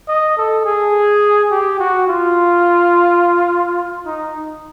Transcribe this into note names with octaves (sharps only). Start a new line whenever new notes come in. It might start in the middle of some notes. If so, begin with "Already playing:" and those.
D#5
A4
G#4
G4
F#4
F4
D#4